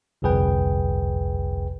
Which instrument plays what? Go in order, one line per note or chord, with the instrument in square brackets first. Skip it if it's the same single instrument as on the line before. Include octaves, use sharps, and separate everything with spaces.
[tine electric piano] G1 C2 F2 G#4 B4 G5